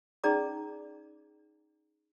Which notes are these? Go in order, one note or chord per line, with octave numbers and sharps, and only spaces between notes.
C#4 D#4 G#4 D5 A#5 D6